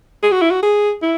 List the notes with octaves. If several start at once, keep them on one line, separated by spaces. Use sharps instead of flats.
G#4
F#4
E4
F#4
G#4
E4